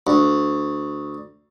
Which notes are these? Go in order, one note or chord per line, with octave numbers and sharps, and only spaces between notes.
D2